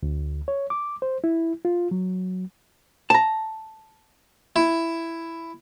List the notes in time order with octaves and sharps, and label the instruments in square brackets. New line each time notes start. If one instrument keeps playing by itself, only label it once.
[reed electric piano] D2
C#5
D6
C5
E4
F4
F#3
[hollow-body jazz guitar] A5 A#5
[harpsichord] E4